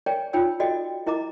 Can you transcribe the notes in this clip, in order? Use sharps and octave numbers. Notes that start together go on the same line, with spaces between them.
A#4 C#5 D5 G5 G#5
D#4 F4 C#5 G5 E6
F#4 A4 D5 D#5 G5
E4 A#4 D#5 A#5 D6